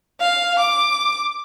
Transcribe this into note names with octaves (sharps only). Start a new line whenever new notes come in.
F5
D6